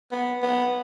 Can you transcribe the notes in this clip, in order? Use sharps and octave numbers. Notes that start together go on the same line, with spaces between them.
B3
B3